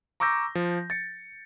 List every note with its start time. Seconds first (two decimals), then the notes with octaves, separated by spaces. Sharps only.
0.20 A#5 C#6 D6 E6 G6 A#6
0.55 F3
0.90 A6 C#7